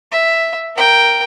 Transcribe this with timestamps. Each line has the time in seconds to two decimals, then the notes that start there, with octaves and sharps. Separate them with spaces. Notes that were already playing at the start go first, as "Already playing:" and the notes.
0.12 E5
0.76 A#4 G5